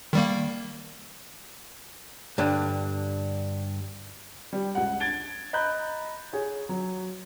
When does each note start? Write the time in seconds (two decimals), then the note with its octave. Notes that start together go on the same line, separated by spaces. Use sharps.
0.13 D#3 G3 A#3
2.38 G2 D3
4.53 G3
4.75 C#2 F#5
5.00 G#6 A6 D7 G7
5.53 D#5 A#5 B5 F#6 G6
6.33 G#4 C#5
6.69 F#3